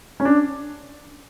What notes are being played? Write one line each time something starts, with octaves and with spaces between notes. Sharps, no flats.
C#4
D4